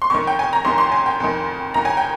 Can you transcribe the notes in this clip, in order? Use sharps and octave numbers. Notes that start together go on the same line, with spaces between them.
C6
F2 D#3 C#6
G5
G#5
A#5
F2 D#3 C6
C6
G#5
G5
F2 D#3
F2 D#3 A#5
G#5
G5